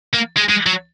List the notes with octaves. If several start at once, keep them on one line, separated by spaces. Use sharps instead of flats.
A#3
G#3
G#3
F#3